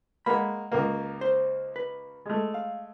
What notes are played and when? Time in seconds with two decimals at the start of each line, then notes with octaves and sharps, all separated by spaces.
0.26 G#3 A#3 F#5 B5
0.72 C#2 A#3
1.21 C5
1.76 B4
2.26 G#3 A3
2.54 F5